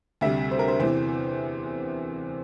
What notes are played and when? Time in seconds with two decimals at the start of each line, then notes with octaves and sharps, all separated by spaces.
0.21 D2 C3 G3 E5
0.51 C5
0.59 A#4
0.68 C5
0.80 E2 C3 E3 C5